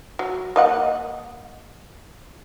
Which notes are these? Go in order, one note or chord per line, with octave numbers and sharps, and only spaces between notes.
F#3
A#3 D#5 F#5